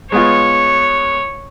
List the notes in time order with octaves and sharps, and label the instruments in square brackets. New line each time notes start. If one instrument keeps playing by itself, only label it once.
[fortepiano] G#3 B3 F4 [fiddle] C#5